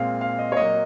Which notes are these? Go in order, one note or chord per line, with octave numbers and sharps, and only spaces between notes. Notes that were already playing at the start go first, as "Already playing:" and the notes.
Already playing: A#2 G#3 C4 F5
F5
D#5
C#5
A#2 F#3 A#3 D#5